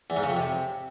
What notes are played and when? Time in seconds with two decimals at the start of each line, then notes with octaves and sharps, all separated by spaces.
0.10 E2
0.17 G#2
0.23 C#3
0.30 F2
0.36 C3